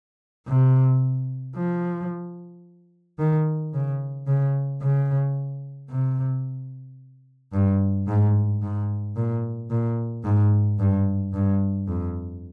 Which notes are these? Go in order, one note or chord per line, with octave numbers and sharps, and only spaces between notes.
C3
F3
D#3
C#3
C#3
C#3
C3
G2
G#2
G#2
A#2
A#2
G#2
G2
G2
F2